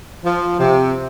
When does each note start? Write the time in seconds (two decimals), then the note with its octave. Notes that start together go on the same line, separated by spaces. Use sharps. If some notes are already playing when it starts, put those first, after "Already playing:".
0.24 F3
0.59 C3